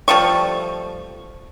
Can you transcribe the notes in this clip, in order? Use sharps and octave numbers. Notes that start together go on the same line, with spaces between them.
F3 G3 A3 C#6